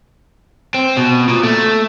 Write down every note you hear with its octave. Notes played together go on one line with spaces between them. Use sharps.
C4
B2
A#2
A3